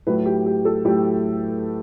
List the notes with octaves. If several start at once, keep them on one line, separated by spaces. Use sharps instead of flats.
A2 F#3 A3 B4
G4
G4
A4
A2 F#3 A3 G4